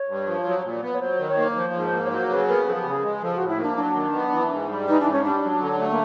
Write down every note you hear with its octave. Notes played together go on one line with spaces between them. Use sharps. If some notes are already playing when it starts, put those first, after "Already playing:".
Already playing: C#5
G2
F3
F#3
A#2
B3
C#5
F#3 C5
D#3
C#5
A#3
F3 C5
G#2
C5
A#3
C#5
F#3 C5
C#3 B4
B3 A#4
F3 A4
G#4
G4
C#3 G#4
G#3
F3 A4
A2 F#4
E4
A#3 D4
F#3 D4
D#3
B3
E3
G#2
G3
E3 D#4
D4
G#2
C#4
G3 D4
F#3
D3
A3
A#3